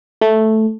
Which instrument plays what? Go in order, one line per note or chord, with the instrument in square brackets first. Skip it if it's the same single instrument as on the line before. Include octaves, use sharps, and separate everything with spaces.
[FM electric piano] A3